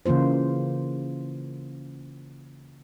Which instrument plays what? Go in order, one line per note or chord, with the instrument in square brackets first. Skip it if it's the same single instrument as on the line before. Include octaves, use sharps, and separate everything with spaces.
[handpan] C#3 E3 A#3 F4 C5